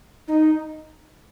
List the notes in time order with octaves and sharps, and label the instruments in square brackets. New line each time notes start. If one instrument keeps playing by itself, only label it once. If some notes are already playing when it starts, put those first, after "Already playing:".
[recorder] D#4